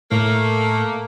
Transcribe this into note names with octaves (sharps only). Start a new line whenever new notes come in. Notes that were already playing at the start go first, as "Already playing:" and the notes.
A2 A3 A#3